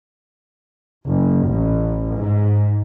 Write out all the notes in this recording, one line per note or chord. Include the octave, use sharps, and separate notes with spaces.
F#1
A1
G#2